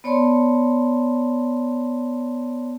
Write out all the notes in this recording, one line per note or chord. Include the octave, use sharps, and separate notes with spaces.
B3 C#5 D5 A5 C6